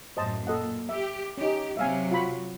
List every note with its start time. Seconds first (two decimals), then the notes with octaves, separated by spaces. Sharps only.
0.17 F#2 A2 C5 D#5 A5
0.47 A#2 A4 D#5 F#5
0.89 G4 E5
1.38 C#4 D#4 G4
1.77 C3 F#3 E5 F5 G#5
2.11 F4 F#4 B5